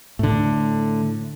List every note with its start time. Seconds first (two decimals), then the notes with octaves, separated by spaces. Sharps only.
0.19 A2 D3